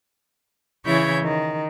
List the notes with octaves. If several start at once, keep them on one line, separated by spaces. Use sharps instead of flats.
C#3 E3 E4 C#5 G6 G#6
D#3